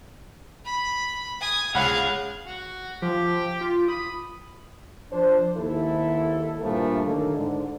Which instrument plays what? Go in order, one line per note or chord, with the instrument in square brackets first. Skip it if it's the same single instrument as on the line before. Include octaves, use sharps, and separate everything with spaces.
[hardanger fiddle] B5
G#5 D#6
[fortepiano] C#2 F#5 B5 [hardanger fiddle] G#4 F5
[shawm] F#4
[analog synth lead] F3 [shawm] G4
[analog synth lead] F4
[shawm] B5 [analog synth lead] D#6
[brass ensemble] F3 D4 C5
D#2 G#2 E4 A4
G2 A#2 E3 F3 A3 A#3
D3 D#3 F#3 A#3 D#4 A4
G#2 D3